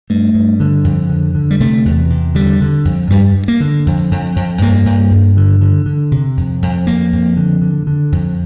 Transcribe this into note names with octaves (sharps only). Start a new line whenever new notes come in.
G2 A3
G2
D3
F2
D3
D3
G3
C3 A3
E2
C3
D3 G3
D3
F2
G2 G3
G2
A#3
D3
F2
F2
F2
G2 A#3
G2
G2
D3
D3
D3
C3
F2
F2
F2 A#3
F2
D3
D3
D3
F2